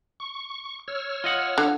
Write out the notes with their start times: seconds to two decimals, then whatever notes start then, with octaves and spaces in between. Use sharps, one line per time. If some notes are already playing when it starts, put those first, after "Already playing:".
0.20 C#6
0.88 C#5 E6 F6
1.24 F4 D#5 F#5
1.58 D3